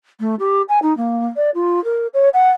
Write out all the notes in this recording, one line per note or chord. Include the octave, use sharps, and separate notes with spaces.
A3
G4
G#5
D#4
A#3
D5
F4
A#4
C#5
F#5